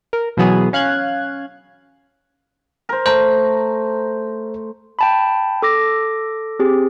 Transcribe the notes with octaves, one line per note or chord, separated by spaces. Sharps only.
A#4
B2 E3 F#3 B3 G#4
C#4 F5 F#6 G#6
A#4 C5
A3 C5 A#5
G5 A5 B5
A4 D6 A#6
C4 G4 G#4